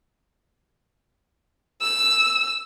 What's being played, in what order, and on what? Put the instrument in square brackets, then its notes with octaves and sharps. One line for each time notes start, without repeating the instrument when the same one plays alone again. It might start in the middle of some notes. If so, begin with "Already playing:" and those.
[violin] E6